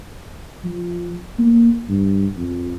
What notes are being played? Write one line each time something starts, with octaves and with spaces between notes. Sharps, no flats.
F3
A#3
G2
F2